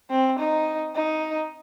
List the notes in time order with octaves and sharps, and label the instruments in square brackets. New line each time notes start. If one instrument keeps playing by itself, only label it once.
[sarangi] C4
D#4
D#4